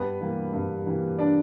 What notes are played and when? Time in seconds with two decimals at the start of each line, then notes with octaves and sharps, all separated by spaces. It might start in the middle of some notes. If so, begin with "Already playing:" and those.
Already playing: G2 B3 B4
0.20 E3 G3 A#3
0.53 G2
0.86 E3 G3 A#3
1.18 D4 D5